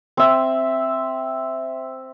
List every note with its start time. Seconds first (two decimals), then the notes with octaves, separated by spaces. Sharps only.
0.17 C4 E5